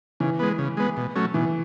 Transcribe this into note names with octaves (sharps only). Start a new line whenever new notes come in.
C#3 E3
G#3 B3
C#3
G#3 B3
B2
F#3 A3 C#4
B2 E3